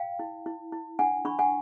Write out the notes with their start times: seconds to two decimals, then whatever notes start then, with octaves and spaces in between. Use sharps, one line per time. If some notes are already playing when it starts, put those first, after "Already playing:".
Already playing: F5 G5
0.19 E4
0.46 E4
0.72 E4
0.99 D4 F#5 G#5
1.25 D4 B5 C#6
1.39 F#5 G#5